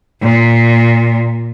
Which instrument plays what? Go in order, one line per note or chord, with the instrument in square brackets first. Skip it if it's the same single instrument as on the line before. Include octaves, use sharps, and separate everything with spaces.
[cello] A#2